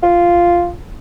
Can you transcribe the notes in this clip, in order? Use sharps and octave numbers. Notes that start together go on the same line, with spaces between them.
F4